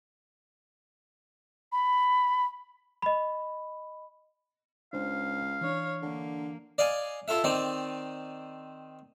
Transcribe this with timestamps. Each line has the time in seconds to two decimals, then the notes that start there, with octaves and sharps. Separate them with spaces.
1.72 B5
3.02 D#5 B5
4.93 C#2 D4 C5 F5
5.61 E3 D4 C#5
6.02 D3 A#3
6.78 D5 D#5 F5 G#5
7.28 E4 F4 A4 E5
7.44 D#3 C4 D#4 D5